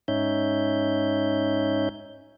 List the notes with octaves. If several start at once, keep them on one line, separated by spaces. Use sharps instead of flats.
G#2 C#4 D#4 C#5 E5 G6